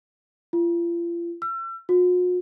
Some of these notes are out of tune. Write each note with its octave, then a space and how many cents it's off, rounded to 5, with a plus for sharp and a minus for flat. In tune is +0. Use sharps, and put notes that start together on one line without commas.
F4 -40
E6 +40
F#4 -45